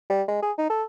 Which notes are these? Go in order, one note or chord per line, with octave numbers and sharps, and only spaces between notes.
G3
G#3
G#4
D#4
A4